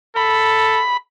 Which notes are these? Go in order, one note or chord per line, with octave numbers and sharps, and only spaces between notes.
A4 B5